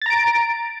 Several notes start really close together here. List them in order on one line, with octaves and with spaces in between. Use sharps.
A6 A#5 D7